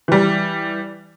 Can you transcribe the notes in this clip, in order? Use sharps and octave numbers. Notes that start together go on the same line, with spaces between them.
E3 G3